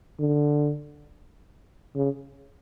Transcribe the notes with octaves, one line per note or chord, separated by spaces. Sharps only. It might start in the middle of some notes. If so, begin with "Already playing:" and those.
D3
C#3